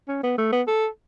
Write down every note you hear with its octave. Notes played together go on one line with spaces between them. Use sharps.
C#4
B3
A3
B3
A4